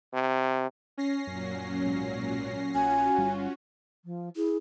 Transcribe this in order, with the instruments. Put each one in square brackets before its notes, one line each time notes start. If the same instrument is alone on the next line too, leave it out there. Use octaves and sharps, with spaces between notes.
[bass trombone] C3
[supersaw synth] C#4 A#6 C7
[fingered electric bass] F#2 [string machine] A#2 F#3
[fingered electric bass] B1 G#2
[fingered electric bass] A#1 [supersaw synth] C#4 F#4 [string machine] F4 [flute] G#5
[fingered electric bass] G1 G2 G3
[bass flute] F3
[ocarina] E4 [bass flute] G#4